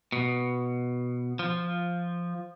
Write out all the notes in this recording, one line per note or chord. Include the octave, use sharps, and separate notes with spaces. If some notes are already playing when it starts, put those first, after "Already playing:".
B2
F3